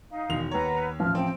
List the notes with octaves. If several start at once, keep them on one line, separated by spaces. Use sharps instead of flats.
D#4 F5
E1 D#3 F7
D#2 B4 C#5 F#5 A#5
A1 F3 F6
C4 G5